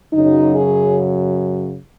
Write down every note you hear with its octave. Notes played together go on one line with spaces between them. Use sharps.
F#2 C#3 F#3 D#4
G#4